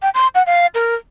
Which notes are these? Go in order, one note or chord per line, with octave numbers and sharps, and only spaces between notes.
G5
C6
F#5
F5
A#4